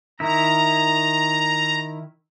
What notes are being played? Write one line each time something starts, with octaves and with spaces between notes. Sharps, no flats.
D#3 E4 A#5